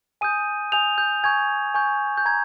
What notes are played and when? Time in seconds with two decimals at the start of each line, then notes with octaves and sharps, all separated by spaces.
0.21 G#5 D#6 G6 D#7
0.72 G#5 D#6 G6 F7
0.98 G6
1.24 G#5 C#6 G6 G#6
1.74 G#5 C#6 G6
2.18 G6
2.26 A#5 C#6 G#6